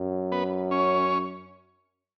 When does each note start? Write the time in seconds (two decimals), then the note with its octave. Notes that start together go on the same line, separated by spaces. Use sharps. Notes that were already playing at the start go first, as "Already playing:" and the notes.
Already playing: F#2
0.32 B3 B4
0.71 C#4 C#5